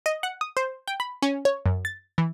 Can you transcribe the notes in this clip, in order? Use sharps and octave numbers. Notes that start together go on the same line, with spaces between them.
D#5
F#5
D#6
C5
G5
B5
C#4
C#5
F#2
A6
E3